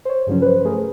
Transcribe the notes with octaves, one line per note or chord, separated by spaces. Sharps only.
C5 C#5
G2 C#3 F3 F#3 C#4
B4 C5
A3 G#4 A#4